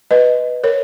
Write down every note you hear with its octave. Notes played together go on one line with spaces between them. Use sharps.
B4 D#5
A#4 C#5